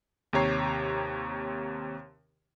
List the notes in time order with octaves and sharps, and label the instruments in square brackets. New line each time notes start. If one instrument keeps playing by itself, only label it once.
[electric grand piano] D#2 C3 G4 C#5 A#5 C7